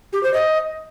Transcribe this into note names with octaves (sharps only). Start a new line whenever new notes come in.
G4
C5
D#5